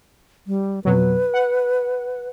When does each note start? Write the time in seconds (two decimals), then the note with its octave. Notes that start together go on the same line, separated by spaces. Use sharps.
0.47 G3
0.85 F2 B2 F#3 B4
1.34 F#5